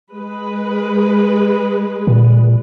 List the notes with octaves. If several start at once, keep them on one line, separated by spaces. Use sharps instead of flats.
G#3 B4
A#2